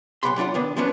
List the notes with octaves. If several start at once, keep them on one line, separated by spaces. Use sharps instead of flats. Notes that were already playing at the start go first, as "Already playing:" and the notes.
B1 G#2 B3 G4 B5 C6
F#3 D4 F4 F#5
D#3 B3 D4
F3 F#3 A#3 B3 C#4 D4